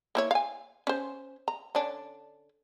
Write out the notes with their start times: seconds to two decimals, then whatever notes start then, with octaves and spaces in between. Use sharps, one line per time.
0.15 A#3 E4 C#5
0.31 F5 G#5
0.87 C#4 C5
1.48 A#5
1.75 D3 C#4 D4